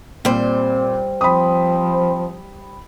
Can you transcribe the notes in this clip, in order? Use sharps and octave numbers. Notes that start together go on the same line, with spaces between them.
A#2 G3 C4 C5
F3 C4 B5 D#6